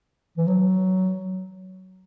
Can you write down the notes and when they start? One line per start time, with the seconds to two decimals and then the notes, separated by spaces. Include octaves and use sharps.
0.37 E3
0.47 F#3